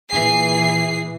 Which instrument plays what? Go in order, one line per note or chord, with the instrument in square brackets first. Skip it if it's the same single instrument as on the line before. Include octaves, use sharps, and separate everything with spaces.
[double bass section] A#2 E3 [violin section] G#4 C7